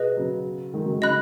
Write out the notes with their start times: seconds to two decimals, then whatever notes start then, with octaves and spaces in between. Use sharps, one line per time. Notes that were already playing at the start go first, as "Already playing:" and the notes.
Already playing: B2 G#4 B4 D#5
0.17 C#3 F#3
0.74 D#3 G#3
0.83 C#3 F#3
0.93 D#3 G#3
1.01 C#3 F#3 D#5 B5 F#6